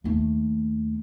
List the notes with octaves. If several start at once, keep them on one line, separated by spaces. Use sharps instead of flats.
D#2 A3